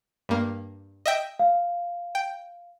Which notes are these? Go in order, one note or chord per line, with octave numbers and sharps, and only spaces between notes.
G2 A#3
D#5 E5 G5
F5
G5